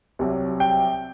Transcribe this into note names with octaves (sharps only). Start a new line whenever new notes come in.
C2 C3 F#3
G5